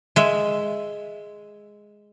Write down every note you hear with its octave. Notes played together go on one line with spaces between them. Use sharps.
G#3 E5